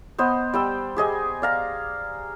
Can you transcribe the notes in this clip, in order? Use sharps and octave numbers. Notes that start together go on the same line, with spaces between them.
B3 C5 D#5
G3 G5 E6
G4 G#4 D#5 G#5
D5 F5 A#5